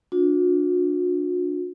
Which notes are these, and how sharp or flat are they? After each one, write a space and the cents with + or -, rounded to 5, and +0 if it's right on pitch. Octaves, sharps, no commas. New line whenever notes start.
D4 +0 F#4 -45